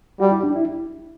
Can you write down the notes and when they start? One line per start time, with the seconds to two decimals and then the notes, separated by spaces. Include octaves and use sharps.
0.20 G3 F#4
0.31 E4
0.43 D4
0.56 E4